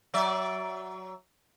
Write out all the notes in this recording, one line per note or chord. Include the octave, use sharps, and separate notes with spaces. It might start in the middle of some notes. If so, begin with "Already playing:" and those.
F#3 D5 E5